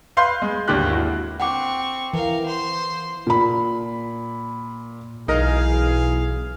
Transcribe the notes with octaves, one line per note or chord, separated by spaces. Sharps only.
B4 F5 C6 G6
G#3
G#1 D#2 D3 G4 F#6
E4 F#4
C4 F#5 G5 C#6 D6
E3 A#4 F5
C5 C6
A#2 B5
B1 E3 D#4 G#4 A#4 D#5 F5